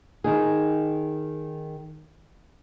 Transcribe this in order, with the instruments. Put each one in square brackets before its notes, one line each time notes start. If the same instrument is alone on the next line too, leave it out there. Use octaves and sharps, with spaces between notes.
[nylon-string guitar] D#3 D#4 G#4